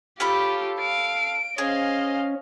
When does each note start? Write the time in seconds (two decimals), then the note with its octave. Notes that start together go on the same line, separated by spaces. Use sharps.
0.20 C#4 F4 G4 A4 B5
0.80 F5 D7
1.58 C#4 G#4 C5 D#5 F5